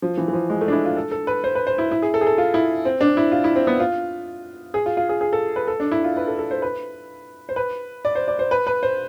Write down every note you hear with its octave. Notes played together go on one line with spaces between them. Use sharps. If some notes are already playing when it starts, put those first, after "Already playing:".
F3
E3
E3
F3
G#3
A3
D4
E4
F4
A4
A4
B4
C5
B4
C5
E4
E4
G#4
A4
G#4
A4
F4
E4
C4
D4
E4
F4
E4
C4
B3
F4
G#4
F4
F4
G#4
G#4
A4
B4
A4
D4
E4
F4
B4
A4
A4
C5
B4
C5
B4
D5
C5
D5
C5
B4
B4
C5